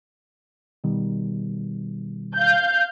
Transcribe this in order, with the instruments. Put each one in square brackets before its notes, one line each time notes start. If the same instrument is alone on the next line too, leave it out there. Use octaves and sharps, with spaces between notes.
[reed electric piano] B2 D#3 G3
[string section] F5 G6